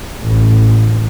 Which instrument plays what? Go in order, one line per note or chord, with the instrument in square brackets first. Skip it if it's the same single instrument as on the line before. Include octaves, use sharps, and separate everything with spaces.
[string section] A1